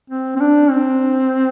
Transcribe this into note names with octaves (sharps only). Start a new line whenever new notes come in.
C4
C4
D4
C4